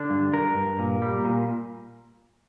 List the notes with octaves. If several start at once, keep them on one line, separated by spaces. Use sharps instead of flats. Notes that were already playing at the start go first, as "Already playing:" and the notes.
Already playing: D3 D4
G2
G2 A#4
G2
A#2
G3
A#2